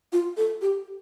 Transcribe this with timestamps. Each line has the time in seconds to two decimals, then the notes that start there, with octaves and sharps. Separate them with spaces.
0.13 F4
0.37 A4
0.62 G4